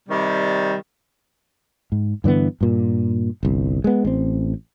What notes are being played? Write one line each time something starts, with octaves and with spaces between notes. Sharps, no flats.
C3 D#3 G3
G#2
G2 D3 E3 B3
G2 A#2
G1 C2
G#3 B3
A1 C4